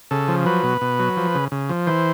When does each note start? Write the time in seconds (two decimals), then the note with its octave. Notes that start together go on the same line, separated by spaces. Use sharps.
0.11 C#3 A4
0.28 F3
0.46 F#3 B4
0.64 B2
0.81 B2
0.99 F#3
1.17 F3
1.35 C#3
1.52 C#3
1.69 F3
1.87 E3 C5